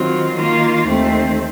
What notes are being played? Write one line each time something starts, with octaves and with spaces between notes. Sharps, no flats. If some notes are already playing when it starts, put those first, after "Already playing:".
Already playing: D#3 F#3 C4 F4
D#3 A#3 F4
D#2 D#3 A3 C4